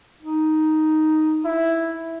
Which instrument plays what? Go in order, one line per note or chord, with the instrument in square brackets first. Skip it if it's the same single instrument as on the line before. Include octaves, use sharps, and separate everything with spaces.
[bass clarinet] D#4
[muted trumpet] E4